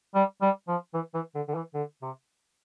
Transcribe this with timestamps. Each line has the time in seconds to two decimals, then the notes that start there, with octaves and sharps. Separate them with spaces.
0.15 G3
0.42 G3
0.68 F3
0.94 E3
1.14 E3
1.35 D3
1.48 D3
1.55 E3
1.74 D3
2.02 C3